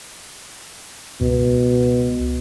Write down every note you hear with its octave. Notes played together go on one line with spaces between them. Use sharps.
C#2 B2